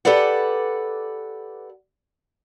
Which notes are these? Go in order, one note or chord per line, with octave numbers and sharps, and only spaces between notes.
G4 A4 B4 D5 F#5